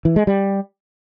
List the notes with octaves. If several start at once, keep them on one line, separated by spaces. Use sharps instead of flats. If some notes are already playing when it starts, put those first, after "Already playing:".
E3
G#3
G3